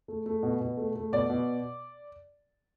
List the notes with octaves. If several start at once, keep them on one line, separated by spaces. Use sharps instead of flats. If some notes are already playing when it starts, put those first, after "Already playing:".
A3
A3
B2
B2
A3
A3
B2 D5
B2